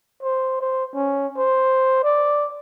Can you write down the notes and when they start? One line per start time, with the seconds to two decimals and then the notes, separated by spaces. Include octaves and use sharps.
0.23 C5
0.61 C5
0.95 C#4
1.38 C5
2.04 D5